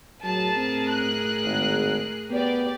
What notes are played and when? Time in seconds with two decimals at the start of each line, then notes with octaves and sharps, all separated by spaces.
0.24 A2 F#3 G#4 A#4 A5
0.57 C4
0.91 F#6
1.44 G#1
2.31 B3 G4 D5